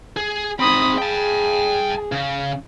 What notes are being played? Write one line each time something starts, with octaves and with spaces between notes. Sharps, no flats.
G#4
C4 D#4 B5 D#6
G#4 G5 A5
C#3